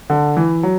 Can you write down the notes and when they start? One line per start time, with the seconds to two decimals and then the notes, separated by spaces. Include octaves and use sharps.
0.10 D3
0.37 E3
0.63 F#3